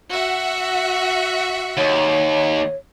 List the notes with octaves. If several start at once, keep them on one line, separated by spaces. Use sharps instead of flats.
F#4 E5 F#5
D#2 C#5